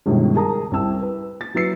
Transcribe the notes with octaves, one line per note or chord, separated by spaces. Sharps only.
G1 C#2 G#2 B2 D#3
G#4 A#4 A5 A#5 D#6
C2 C4 E4 A5 E6
B4
A6
F#3 E4 B4 E6 C7 C#7